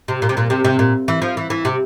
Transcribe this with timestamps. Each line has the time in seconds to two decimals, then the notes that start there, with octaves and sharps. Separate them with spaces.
0.08 C3
0.22 A#2
0.29 C3
0.37 A#2
0.50 C3
0.64 C3
0.79 A#2
1.08 E3
1.22 F3
1.37 E3
1.50 E3
1.65 C3